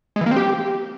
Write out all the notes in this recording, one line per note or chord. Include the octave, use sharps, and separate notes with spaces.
G#3
E3
A#3
C4
G4